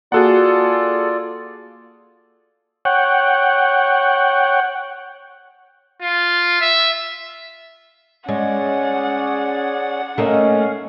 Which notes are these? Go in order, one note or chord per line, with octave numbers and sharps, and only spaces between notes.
A#3 F4 F#4 G#4 A4 D5 F#5
C#5 F#5 G5
F4
E5
G#3 C#4 G#4 C#5 D5 F#5
A3 A#3 C#4 D#4 F5